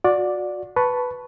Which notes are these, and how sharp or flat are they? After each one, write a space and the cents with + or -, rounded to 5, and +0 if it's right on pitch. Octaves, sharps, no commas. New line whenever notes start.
F#4 -30 D5 +0
B4 +0 A5 +0 C#6 +0